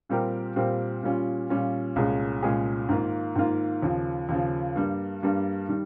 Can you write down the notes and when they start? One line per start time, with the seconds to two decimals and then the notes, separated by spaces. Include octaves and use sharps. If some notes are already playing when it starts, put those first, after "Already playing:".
0.09 A#2 G3 C4 G4 A#4
0.56 A#2 G3 C4 G4 A#4
1.03 A#2 G3 C#4 F4
1.49 A#2 G3 C#4 F4
1.96 C2 A#2 G#3 C#4 G#4
2.43 C2 A#2 G#3 C#4 G#4
2.89 G#2 D#3 A#3 F4
3.36 G#2 D#3 A#3 F4
3.82 D#2 C#3 F3
4.29 D#2 C#3 F3
4.75 G2 G3 A#3
5.22 G2 G3 A#3
5.69 D#3 G3